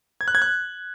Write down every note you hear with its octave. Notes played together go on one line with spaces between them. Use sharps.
G#6
F#6
G#6
F#6